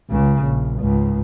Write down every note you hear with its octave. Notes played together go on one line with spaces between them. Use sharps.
C#2 C#3
A#1
C#2 G#2